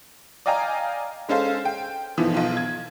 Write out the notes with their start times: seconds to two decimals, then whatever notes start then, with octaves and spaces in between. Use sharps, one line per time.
0.46 D5 D#5 F5 G5 G#5 A#5
1.29 G#3 C#4 A4 C5 F5
1.65 G5
2.17 G1 G#2 B2 E3 F3
2.34 B1 B2 F4
2.57 G#6